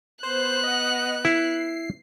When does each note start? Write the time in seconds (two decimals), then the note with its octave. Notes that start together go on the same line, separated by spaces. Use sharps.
0.23 B3 C5 F#6
0.64 D#5 F#5
1.25 E4 C7